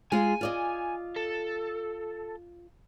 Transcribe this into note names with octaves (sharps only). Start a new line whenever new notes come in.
G#3 F4 G#4 G#5
F4 D5 D#5
A4